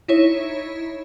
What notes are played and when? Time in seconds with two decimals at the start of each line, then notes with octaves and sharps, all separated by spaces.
0.08 D#4 E4 C#5